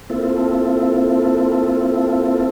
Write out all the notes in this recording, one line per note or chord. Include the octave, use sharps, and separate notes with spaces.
A#3 C4 E4 F4 A4